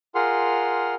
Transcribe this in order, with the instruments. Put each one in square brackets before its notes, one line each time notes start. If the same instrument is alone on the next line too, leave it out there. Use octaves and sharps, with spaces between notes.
[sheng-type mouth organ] F4 G#4 A#4 F#5 C6 F6